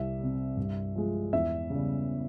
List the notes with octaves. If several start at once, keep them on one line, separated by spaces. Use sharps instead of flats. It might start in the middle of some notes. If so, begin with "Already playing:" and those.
Already playing: C2 E5
C3 G3
G2
F3 G#3
E2 E5
C#3 G3